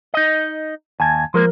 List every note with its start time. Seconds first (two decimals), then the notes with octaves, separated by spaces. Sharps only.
0.14 D#4 D#5
1.00 D#2 G#5 A5 G#6
1.34 F3 G#3 A#3 A#4